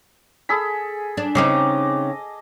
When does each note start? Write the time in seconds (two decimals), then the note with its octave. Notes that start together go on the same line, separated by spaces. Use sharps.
0.49 G#4 A4 B5
1.17 D4
1.35 C#3 C4 D#4 D#5 D6